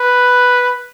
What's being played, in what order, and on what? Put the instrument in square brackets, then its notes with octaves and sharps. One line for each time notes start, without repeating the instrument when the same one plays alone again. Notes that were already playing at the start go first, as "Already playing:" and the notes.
Already playing: [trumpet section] B4